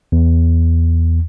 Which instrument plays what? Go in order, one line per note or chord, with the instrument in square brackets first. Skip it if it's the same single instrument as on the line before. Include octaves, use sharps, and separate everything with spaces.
[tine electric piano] E2